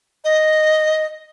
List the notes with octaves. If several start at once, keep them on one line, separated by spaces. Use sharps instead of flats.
D#5